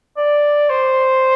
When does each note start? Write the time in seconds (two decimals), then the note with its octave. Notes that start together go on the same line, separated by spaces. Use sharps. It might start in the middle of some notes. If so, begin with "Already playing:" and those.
0.17 D5
0.70 C5